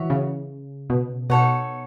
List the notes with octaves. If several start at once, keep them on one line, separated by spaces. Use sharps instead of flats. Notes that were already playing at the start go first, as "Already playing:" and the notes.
Already playing: E3 F#4 C#5 E5
C#3
B2
B2 D#4 A4 C#5 F#5